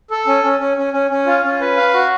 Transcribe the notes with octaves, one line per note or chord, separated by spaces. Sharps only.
A4
C#4
C#4
C#4
C#4
C#4
C#4
F4
C#4
B4
F5
F#4